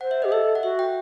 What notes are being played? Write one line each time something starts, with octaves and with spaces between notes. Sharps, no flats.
C5 F#5
E5
G4 D#5
A4 E5
F#5
F#4 E5
G5